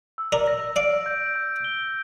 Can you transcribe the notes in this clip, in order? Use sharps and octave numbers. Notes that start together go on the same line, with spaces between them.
E6
A#4 D5
A#6
D5 F5 D7
G6
G6
G7